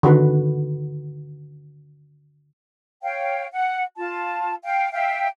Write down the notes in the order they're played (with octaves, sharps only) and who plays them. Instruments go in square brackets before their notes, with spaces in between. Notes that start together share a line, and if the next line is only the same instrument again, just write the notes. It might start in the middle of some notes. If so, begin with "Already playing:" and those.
[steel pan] D3 D#3 F#4 B4
[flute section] C#5 F5 G5
F#5
F4 A5
F5 G5
E5 F5 G5